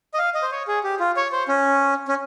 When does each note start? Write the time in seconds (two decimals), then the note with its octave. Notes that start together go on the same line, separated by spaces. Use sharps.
0.14 D#5
0.18 F5
0.35 D#5
0.42 C5
0.51 C#5
0.68 G#4
0.84 G4
1.00 F4
1.17 C#5
1.32 C5
1.48 C#4
2.08 C#4